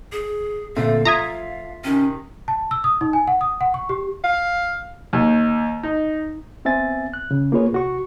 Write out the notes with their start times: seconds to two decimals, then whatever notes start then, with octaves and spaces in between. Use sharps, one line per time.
0.12 G#4
0.76 A#2 D3 A3 C4 F5
1.05 F3 F4 E5 A#5 D#6 G#6
1.84 C3 D#3 C#4
2.48 A5
2.71 E6
2.84 D#6
3.01 D#4
3.13 G#5
3.27 F#5
3.41 D#6
3.61 F#5
3.74 C#6
3.89 G4
4.24 F5
5.13 D#2
5.83 D#4
6.65 B3 C4 E5 G#5 A6
7.14 F#6
7.31 C#3
7.52 A#3 B3 F4 G#4 B4 C#5
7.72 C2 F#4 C#6